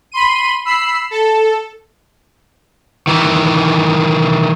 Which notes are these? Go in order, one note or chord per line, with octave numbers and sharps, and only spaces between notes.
B5 C6 D#7
B5 E6 C7
A4
D#3 E3